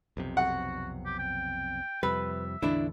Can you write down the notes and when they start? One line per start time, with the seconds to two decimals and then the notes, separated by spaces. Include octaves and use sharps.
0.17 B1 F2 C3
0.37 F#4 F#5
1.06 G4
1.19 G5
2.03 F2 C3 G3 B4 E5
2.62 A1 E2 D3 D4 E4